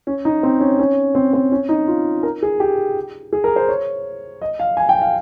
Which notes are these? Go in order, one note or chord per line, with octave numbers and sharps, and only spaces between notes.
C#4
D#4
C4
C#4
C#4
C4
C4
C#4
D#4
F4
A#4
G#4
G4
G#4
A#4
C5
C#5
D#5
F5
G#5
G5
F5